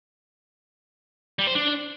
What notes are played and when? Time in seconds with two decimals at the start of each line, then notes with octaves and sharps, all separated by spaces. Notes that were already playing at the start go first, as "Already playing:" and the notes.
1.39 G3
1.47 C5
1.55 D4